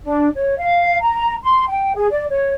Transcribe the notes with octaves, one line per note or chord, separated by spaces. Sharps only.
D4
C#5
F5
A#5
C6
G5
G#4
D5
C#5